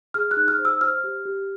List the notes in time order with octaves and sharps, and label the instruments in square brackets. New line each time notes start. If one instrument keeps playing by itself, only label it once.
[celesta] G#4 F6
F#6
D#4
F6
C5
E6
C5 F6
G4
G4